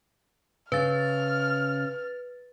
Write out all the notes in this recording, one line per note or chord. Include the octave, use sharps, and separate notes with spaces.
C#3 B4 F6 A6